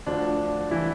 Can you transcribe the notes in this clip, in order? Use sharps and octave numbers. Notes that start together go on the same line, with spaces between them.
D2 D3 F3 D4
E3 E4